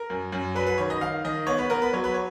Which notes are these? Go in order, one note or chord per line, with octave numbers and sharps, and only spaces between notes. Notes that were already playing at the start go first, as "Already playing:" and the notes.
Already playing: A#4
F#2
F#2
F#3 B4
B4
D#3 C#5
D#5
D#3 F5
D#3 D#5
B3 C#5
B4
B3 A#4
B4
F#3 C#5
B4
C#5